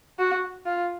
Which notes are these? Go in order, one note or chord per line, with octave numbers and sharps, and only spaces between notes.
F#4
F4